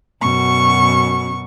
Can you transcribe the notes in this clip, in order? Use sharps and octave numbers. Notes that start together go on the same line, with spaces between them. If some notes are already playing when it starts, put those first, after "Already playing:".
F#2 B2 C#6